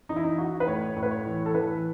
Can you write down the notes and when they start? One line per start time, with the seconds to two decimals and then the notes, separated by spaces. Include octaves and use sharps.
0.09 E3 D#4
0.16 E4
0.24 D#4
0.38 E3 F#4
0.60 B4
0.67 A2 C#5
0.96 A2
1.03 B4
1.11 C#5
1.26 E3
1.46 A4
1.54 E3 B4